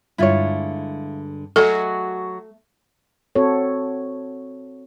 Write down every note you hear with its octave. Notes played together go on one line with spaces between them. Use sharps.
G2 D3 G#3 E4 F4 C#5
F#3 A3 F#4 G#4 A4 D#5
C4 F#4 A4 C#5